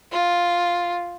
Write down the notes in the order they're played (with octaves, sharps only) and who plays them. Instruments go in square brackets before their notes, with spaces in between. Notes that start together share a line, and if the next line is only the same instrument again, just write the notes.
[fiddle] F4